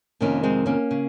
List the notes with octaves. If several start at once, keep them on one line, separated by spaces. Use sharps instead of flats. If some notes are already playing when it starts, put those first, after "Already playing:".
F2 C3 D#3 A#3 C#4
G#3 C4
A#3 C#4
C#3